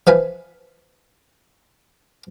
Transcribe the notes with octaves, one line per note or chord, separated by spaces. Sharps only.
F3 B4 E5 F5 G#5